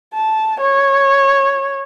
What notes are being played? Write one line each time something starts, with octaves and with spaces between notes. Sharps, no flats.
A5
C#5